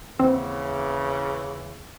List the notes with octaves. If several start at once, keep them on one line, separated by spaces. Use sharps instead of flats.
D#2 C#3 E3 C4 F#5